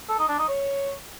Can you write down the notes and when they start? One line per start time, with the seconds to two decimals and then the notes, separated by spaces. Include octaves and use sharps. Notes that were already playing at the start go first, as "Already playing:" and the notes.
0.09 A4
0.19 D#4
0.29 D4
0.38 D#4
0.48 C#5